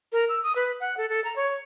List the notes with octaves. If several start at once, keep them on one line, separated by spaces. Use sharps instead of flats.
A#4
E6
D#6
B4
F#5
A4
A4
A#5
C#5